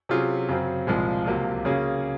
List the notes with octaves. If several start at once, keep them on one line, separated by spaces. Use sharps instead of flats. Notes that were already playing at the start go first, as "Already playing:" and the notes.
C3 F#3 C#4 F4 G#4
F#2 C#3 F#3 C4
C2 A#2 F3 G#3
C#2 C3 F#3 A#3 F4
C#3 F#3 A#3 C#4 G#4